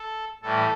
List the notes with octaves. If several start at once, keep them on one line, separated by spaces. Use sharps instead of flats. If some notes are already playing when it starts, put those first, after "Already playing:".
Already playing: A4
A2 E3 G3 A4